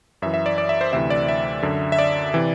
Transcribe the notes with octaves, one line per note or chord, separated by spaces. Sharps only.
F#2 E3 E5
E5
D5
D5
E5
C5
D2 C3 E3 E5
D5
E5
F#2 D3
E5
D5
C3 E3